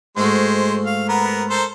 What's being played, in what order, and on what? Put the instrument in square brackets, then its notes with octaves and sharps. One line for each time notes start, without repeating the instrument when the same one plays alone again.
[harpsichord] G#2 A3 F#4 [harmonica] G#3 C5
[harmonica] F5
B3 A#4
A4 A#4 C5